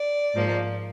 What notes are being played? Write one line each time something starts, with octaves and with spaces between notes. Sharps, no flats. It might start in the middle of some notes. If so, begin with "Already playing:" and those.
Already playing: D5
G#2 F3 A#3